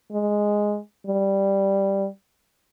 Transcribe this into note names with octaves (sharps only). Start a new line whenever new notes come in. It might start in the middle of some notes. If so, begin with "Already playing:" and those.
G#3
G3